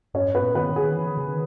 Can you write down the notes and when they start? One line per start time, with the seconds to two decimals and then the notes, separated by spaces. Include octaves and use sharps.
0.14 G2 C#4 C#5
0.28 G2
0.35 B3 B4
0.42 A#2
0.55 D#3 B3 B4
0.69 D#3
0.76 G#4
0.82 D#3
0.95 E3
1.07 D#3
1.18 C#3
1.28 D#3